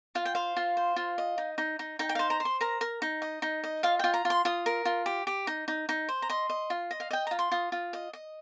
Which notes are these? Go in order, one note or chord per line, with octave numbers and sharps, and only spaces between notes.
F4 F5
G5
C5 F5
F4
C5
F4
D#5
D#4
D#4
D#4
D#4 G5
G5
C5 F5
A#5
C5
C6
A#4 A#5
A#4
D#4
D#5
D#4
D#5
F4 F5
F4 G5
A#5
F4
C6
F4 D#6
A#4
F4
G4
G4
D#4
D#4
D#4
C5
A#5
D#5 C6
D#5
F4
D#5
F5
D#5 G5
F4 A#5
C6
F4 D#6
F4
D#5
D#5